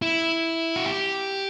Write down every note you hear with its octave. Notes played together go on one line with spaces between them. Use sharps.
E4
F#4
G4